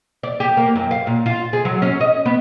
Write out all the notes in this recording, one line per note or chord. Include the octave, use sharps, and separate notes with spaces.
D5
G4
A#3
F#2
F5
A#2
F4
G#4
F#3
C#4
D#5
B3